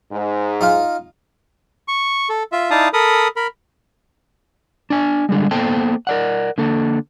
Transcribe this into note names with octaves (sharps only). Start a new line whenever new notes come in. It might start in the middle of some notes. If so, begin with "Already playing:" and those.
G#2
D#4 F4 F5
C#6
A4
F4 E5
D#4 E4 D5 F5 A5 D#6
A4 A#4 B5 D#6
A#4 B5
D4 G#5
D3 G3 G#3
A#3 B3 A4 C5 G5 A5
A#4 D5 F#5
D3 A#3 A4